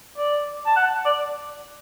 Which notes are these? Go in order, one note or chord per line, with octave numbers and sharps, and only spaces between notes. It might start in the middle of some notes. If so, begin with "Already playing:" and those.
D5
A5
F#5
D5